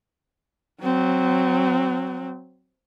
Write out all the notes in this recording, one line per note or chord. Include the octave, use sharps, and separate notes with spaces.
F#3 C4